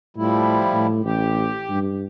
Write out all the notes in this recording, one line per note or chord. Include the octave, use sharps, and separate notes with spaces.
A2 F3 G3 E4
A2
A1 G4
G2